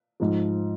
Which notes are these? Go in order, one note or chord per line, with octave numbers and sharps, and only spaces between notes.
G#2 F3